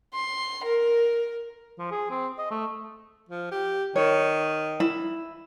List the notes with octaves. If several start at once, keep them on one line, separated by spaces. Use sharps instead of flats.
C6
A#4
F3
G#4
C4
D#5
A3
F3
G4
D#3 C#5
E4